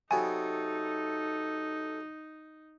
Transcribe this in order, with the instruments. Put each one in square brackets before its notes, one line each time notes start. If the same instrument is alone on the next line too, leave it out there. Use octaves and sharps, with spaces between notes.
[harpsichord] C3 F#3 B3 [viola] D#4 [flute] A4 [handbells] G#5